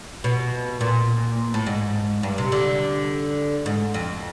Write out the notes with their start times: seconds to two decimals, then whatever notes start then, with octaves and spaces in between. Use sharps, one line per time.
0.24 B2
0.81 A#2
1.54 A2
1.66 G#2
2.23 G2
2.38 C3
2.52 D3
3.66 G#2
3.94 F2